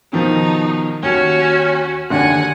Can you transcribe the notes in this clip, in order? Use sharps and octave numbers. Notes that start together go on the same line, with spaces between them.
B2 D#3 F3 D#4
D#2 C#4 F#4
F#1 D#2 D3 F#5 G#5